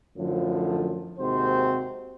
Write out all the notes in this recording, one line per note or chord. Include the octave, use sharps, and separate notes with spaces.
F#2 A2 D3 F3
D#2 G#2 C3 C4 F#4 C5